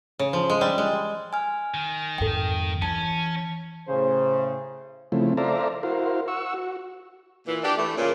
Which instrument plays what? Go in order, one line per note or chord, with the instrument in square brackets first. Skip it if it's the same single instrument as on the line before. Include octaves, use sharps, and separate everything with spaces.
[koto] C#3
F3
G#3
G3
G#3
[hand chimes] G#5 F6
[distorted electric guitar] D#3
[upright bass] F2 G#2 [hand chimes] A4 G5
[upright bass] E3 [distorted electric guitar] C#4 [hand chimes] A5
[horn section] A2 C#3 [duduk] C5
[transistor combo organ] C#3 F3 A3 C4 E4
A4 C5 D5 E5 F5 A#5
E4 F#4 A#4 C5 F5
F#5 C#6 E6
F#4
[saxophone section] A#2 E3
D4 G4
E3 A3
A#2 C#3